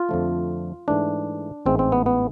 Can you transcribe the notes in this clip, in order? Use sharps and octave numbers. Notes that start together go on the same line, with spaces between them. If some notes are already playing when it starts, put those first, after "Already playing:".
Already playing: F4
F2 D3 F3 A3
G#2 E3 A3 D4
A1 G#2 E3 G#3 C4
C4
B3
B3